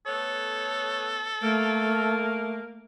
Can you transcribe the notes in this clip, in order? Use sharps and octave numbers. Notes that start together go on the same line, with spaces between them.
A3 B3 A4 C#5
A3 A#3 A#4